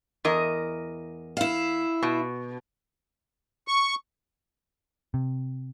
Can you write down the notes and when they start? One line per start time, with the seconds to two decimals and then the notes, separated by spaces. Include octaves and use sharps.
0.25 E2 A#4 D#5
1.37 E4 F5
2.03 B2
3.68 C#6
5.14 C3